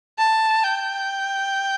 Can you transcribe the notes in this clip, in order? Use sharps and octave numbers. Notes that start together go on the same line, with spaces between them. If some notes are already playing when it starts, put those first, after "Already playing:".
A5
G5